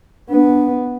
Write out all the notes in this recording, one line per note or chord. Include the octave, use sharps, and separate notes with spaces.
B3 D4